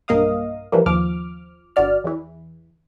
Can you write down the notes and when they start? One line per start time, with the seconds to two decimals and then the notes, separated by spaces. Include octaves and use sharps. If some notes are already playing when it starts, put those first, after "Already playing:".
0.08 B1 G2 A#3 D#5 F5 D#6
0.72 E3 F3 G3 A#3
0.86 D#2 F3 D6 F6
1.76 G1 F#4 D5 F6
2.04 E2 E3